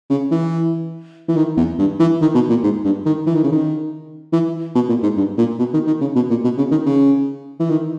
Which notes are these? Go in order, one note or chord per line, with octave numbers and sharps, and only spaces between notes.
C#3
E3
E3
D#3
E2
G2
E3
D#3
B2
A#2
G#2
G2
D#3
E3
D#3
C#3
D#3
E3
B2
A#2
G#2
G2
A#2
B2
D#3
D#3
C#3
B2
A#2
B2
C#3
D#3
C#3
E3
D#3